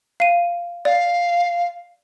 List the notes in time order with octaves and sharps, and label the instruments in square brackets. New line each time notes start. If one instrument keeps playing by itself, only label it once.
[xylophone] F5 D#7
[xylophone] D5 [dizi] F5